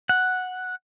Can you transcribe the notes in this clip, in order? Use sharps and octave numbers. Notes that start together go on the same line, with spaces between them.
F#5